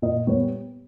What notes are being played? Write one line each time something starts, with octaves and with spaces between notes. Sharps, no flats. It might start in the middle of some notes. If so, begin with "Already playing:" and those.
A#2 D#5
G3 B3 C#5